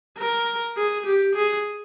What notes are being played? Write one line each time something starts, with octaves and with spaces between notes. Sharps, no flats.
A#4
G#4
G4
G#4